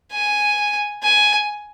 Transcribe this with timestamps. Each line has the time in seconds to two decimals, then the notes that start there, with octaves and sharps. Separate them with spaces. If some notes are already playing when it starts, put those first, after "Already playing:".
0.12 G#5
1.03 G#5